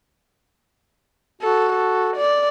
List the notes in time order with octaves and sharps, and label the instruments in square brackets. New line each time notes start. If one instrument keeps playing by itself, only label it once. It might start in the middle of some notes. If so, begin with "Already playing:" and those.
[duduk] F#4 [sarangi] A4
[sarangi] A4
D5